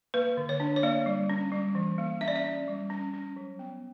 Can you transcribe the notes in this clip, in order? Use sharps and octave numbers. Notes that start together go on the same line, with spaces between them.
A#3 B4
D3
C#5
D4
C#5
A#3 D5
G3
C#4
G3
E3
A#3
C#4 E5
D5
E5
C#4
G3
C#4
C#4
F#3
B3